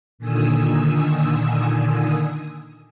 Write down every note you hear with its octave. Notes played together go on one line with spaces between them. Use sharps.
A#2 D3 D#3 G#5 D#6 E6